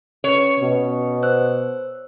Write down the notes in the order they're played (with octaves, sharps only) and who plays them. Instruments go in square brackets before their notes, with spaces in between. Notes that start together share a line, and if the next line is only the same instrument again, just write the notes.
[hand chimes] C#4 B4 [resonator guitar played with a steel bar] C#5
[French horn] B2
[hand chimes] C5 E6 F#6